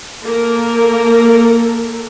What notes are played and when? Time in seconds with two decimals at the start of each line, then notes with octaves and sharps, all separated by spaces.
0.24 A#3 A4 A#4